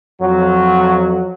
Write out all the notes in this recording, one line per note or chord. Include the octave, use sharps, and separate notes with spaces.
F2 F#3